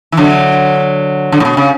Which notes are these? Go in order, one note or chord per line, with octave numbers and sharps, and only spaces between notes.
E3
D3 F#3
D3
A2
B2
C#3